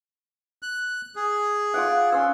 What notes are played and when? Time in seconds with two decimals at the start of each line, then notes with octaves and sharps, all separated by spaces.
0.63 F#6
1.16 G#4
1.74 F4 D5 F#5
2.12 C#4 C6 E6